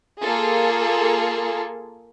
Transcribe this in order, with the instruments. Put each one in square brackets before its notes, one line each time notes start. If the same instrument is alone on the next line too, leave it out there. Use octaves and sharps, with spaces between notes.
[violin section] A#3 F4 G#4 A4